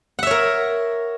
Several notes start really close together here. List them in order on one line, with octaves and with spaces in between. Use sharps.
F#5 E5 C#5 A#4